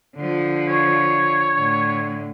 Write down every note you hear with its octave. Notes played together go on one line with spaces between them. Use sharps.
D3 F3
C#5
A2 D3